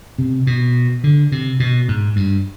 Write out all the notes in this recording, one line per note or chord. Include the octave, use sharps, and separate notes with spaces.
C3
B2
D3
C3
B2
G#2
G2